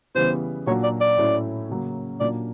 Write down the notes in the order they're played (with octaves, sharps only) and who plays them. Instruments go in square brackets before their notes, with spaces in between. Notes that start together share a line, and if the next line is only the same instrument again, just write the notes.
[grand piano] C#3 E3 G3 B3 [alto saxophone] C5
[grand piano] A#2 F#3 A#3 D4 F#4 [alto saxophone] C#5
[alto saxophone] D5
D5
[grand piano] A2 F#3 A3 C#4 E4
C#3 F#3 A#3
[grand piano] A#2 F#3 A#3 D4 [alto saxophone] D5